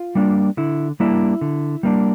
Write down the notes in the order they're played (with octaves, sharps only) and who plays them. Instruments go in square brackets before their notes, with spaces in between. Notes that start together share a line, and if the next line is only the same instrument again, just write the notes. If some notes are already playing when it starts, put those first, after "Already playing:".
Already playing: [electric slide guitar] F4
G3 A#3 D4
D3 E4
G3 A#3 D4 E4
D3
G3 A#3 D4